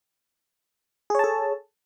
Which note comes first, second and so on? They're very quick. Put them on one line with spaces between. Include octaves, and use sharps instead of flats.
G#4 C#5 A5 A4